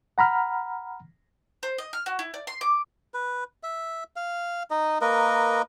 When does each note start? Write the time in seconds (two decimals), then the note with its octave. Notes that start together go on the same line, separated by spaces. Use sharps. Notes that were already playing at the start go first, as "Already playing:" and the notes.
0.18 F#5 A#5 B5 F6
1.63 C5
1.78 D#5
1.93 F6
2.06 F#4
2.19 E4
2.34 D5
2.47 C6
2.61 D6
3.14 B4
3.63 E5
4.16 F5
4.71 D#4 D#5
5.01 A#3 A#4 B4 D#5